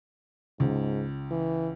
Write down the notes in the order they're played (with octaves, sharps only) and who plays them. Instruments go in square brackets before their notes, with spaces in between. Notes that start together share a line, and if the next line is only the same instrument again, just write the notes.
[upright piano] C#2 [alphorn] G#2
[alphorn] E3